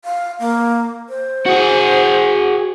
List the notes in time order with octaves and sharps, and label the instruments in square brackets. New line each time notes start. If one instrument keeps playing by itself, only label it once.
[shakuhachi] F5
A#3
C5
[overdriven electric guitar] F#4 G#4